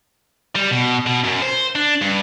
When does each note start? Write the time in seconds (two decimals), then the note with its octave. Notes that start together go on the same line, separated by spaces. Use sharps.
0.55 G3
0.71 B2
1.06 B2
1.24 F#2
1.42 C5
1.75 D4
2.02 G2